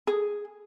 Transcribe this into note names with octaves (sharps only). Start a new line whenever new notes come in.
G#4